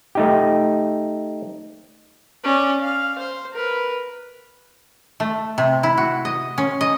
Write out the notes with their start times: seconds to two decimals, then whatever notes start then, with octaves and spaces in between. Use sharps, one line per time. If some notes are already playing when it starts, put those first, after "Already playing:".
0.15 A3 D#4 G4
2.44 C#4 D5
2.81 F5
3.18 C5
3.53 A#4 B4
5.20 A3
5.58 C3
5.83 E4
5.98 F#4
6.25 D#5
6.58 C#4
6.81 D#5